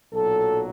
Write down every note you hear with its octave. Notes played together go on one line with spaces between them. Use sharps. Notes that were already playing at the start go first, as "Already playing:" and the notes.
B1 A#2 F#3 A4